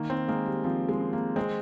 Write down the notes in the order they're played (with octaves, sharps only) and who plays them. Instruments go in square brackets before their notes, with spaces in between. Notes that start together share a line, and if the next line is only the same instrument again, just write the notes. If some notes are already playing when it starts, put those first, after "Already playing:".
Already playing: [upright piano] D#3 [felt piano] A#3
[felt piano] C4
[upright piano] G#3 [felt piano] A#3
[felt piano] G3
[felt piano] F3 [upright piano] C4
[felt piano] G#3
[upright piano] C4
[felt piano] A#3
[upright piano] G#3 [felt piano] C4